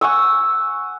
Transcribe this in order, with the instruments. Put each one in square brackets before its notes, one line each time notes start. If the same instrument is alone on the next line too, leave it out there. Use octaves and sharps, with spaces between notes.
[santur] F#5 G#5 C#6 E6